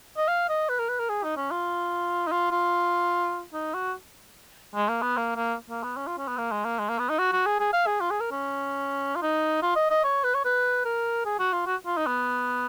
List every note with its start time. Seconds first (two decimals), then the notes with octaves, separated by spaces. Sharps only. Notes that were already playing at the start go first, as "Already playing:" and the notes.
0.18 D#5
0.28 F5
0.50 D#5
0.69 B4
0.79 A#4
0.89 B4
0.99 A#4
1.10 G#4
1.24 D#4
1.37 C#4
1.51 F4
2.27 D#4
2.32 F4
2.52 F4
3.54 D#4
3.74 F#4
4.76 G#3
4.89 A#3
5.02 B3
5.17 A#3
5.36 A#3
5.70 A#3
5.84 B3
5.97 C#4
6.07 F4
6.18 C#4
6.28 B3
6.38 A#3
6.52 G#3
6.65 A#3
6.79 G#3
6.90 A#3
6.99 B3
7.10 D#4
7.19 F#4
7.33 F#4
7.46 G#4
7.60 G#4
7.73 F5
7.87 G#4
8.01 F4
8.11 G#4
8.21 A#4
8.32 C#4
9.16 F4
9.22 D#4
9.63 F4
9.76 D#5
9.91 D#5
10.04 C#5
10.24 B4
10.35 C#5
10.45 B4
10.85 A#4
11.26 G#4
11.40 F#4
11.53 F4
11.67 F#4
11.86 F4
11.97 D#4
12.07 B3